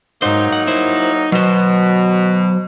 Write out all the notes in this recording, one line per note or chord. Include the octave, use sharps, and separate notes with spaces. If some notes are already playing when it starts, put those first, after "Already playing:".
G#2 F#3 A#3 D#4 C5
F#5
E4 C5
B2 F#3 C5